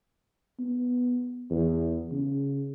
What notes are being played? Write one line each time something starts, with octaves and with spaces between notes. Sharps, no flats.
B3
E2
C#3